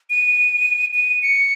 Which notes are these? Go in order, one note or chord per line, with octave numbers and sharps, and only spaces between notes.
D#7
D#7
C#7